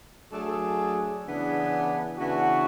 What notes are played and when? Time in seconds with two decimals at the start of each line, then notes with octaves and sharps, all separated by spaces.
0.30 F#3 A3 D4 G#4
1.24 C#3 E3 B3 D4 G#4
2.18 C#3 E3 B3 D4 F#4